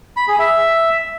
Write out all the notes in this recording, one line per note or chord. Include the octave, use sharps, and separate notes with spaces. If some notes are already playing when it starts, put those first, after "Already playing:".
B5
G#4
E5